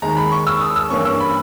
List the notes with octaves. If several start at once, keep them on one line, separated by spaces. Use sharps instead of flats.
D#2 D#3 G#3 A#5
B5
C#6
E6
D#6
E6
G2 E3 A#3 C#4 C#6
E6
B5